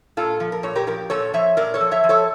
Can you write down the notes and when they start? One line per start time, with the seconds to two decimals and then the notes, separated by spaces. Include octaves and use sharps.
0.17 A#2 F4 A4
0.40 F3
0.52 A#4
0.63 A#2 C#5
0.75 G4 A#4
0.87 F3 G4 A#4
1.10 A#2 A4 C#5
1.34 F3 C#5 E5
1.57 A#2 A#4 D5
1.74 A4 C#5
1.81 F3
1.91 C#5 E5
2.04 F3
2.09 A4 C#5